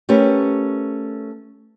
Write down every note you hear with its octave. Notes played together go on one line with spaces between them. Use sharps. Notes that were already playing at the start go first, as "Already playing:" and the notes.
A3 C#4 G4 A#4 B4